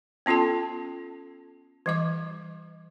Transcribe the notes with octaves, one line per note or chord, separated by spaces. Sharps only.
B3 C#4 F4 A4 A5
E3 G3 D6